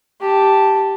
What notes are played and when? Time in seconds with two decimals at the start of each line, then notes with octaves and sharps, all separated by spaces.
0.21 G4 A5